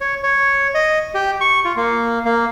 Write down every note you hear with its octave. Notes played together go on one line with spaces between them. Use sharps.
C#5
C#5
D#5
G4
C#6
F4
A#3
A#3